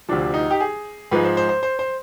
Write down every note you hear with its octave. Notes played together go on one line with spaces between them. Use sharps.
D2 C3 F3 D4
D#4
G4
G#4
G#2 F3 G#3 B4
C5
C5
C5
C5
C5